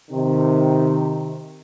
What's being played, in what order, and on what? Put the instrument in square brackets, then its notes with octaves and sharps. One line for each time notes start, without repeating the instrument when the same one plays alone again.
[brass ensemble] C3 D#3